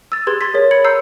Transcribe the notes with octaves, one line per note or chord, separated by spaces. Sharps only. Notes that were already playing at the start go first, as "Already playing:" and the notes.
E6 A6
G4 G#4 B4 C6 G#6
C6 G#6 A6 B6
G#4 A#4 C#5
B5 G#6 C#7 F#7
A#5 C6 E6 G6 C7